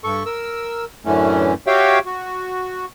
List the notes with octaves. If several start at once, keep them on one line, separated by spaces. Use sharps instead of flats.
G2 A4 C#6
A#4 E6
F#2 A2 D3 E3 A3 C#4
F#4 G4 C#5 E5 F5 G5
F#4